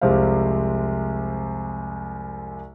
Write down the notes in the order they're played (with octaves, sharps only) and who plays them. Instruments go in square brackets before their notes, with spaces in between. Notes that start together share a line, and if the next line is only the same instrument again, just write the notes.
[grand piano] C2 F2 C3 G#3 C5 F5